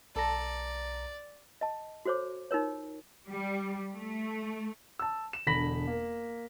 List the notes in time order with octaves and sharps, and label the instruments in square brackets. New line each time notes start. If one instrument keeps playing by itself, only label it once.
[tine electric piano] B1 A#5 A#6 [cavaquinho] A4 [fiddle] D5
[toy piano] D#5 A5
F#4 A4 C5 C#5 D6
D#4 F4 A#4 C#5
[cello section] G3
A3
[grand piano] A5 E6
E7
E1 D3 B5 A#6 B6 F#7
A#3